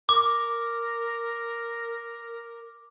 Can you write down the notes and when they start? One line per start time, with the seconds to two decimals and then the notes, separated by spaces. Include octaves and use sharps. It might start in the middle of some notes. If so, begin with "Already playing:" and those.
0.09 A#4 D6